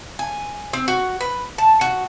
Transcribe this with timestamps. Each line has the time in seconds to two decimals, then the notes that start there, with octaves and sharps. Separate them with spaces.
0.19 G#5
0.73 C4
0.88 F#4
1.21 B4
1.58 A5
1.81 F#4